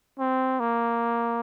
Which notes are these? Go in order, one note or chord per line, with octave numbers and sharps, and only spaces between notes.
C4
A#3